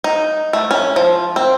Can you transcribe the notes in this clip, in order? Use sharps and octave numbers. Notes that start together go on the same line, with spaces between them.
D#4
A3
C#4
F3
C4